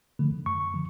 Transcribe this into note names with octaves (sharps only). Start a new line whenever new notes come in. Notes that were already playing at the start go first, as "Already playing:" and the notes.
D3 F3 A3
F#2 C#6
D3 F3